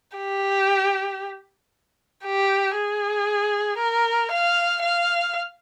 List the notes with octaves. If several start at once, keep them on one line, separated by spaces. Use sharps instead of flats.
G4
G4
G#4
A#4
F5
F5